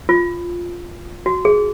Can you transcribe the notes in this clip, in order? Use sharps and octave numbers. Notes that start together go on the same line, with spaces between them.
F4
F#4
G#4